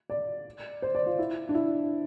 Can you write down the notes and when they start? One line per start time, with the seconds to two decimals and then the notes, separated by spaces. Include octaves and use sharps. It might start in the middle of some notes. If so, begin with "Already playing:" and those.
0.10 D5
0.82 C5
0.95 D5
1.06 F4
1.19 E4
1.49 D4
1.55 E4